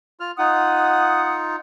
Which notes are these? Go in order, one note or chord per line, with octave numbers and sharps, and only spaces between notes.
F4 F6
D#4 F4 F#5 D#6